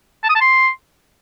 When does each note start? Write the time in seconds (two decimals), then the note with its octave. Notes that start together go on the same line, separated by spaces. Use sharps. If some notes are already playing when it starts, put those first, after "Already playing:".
0.23 A5
0.29 D#6
0.35 A5
0.41 C6